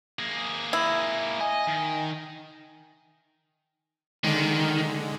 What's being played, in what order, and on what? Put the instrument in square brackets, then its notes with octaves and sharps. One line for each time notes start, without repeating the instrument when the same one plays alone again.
[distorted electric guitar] A#3 G#4
[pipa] E4
[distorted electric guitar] D#5 [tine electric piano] G#5
[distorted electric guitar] D#3
[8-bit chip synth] D3 G#3 [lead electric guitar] D#3